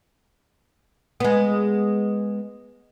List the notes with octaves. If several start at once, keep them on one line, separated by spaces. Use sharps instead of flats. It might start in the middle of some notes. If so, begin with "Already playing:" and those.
G#3 B3